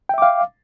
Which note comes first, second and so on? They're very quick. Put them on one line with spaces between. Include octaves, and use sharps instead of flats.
G5 E5 D6 F5